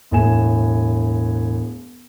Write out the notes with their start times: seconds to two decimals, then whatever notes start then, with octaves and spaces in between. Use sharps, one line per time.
0.11 E1 A2 G#5 E7